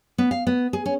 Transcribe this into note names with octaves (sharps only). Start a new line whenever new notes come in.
B3
F5
B3
G#4
C#4